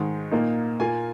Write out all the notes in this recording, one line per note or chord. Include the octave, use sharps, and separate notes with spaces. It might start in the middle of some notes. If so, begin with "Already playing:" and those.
Already playing: G#2 D#3 G#3
A#2 A#3 D#4
A#2 A#3 F4 G#5